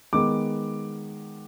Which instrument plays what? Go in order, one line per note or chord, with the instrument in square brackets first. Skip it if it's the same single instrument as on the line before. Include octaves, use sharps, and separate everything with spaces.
[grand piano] D#3 G#3 B3 D6